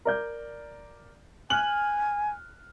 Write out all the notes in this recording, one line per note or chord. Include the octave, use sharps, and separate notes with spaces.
A#4 D5 G6
G#5 F6 F#6 F#7